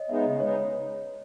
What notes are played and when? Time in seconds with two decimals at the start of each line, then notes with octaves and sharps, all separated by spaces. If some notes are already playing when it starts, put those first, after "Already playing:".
Already playing: C#5 D#5
0.09 G#3 B3 D#4 E5
0.25 C#3 D#5
0.40 G#3 B3 D#4 C#5